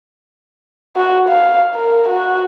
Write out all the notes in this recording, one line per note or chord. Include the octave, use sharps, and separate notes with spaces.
F#4
F5
A#4
F#4